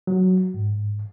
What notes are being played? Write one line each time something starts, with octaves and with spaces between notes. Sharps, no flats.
F#3
G#2